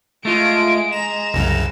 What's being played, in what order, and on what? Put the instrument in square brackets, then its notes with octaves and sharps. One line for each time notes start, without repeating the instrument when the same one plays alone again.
[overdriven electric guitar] G#3 [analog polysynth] A3 F4 [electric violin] D7
[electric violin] A#5 [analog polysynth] E7
[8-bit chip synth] C2 F#2 C#3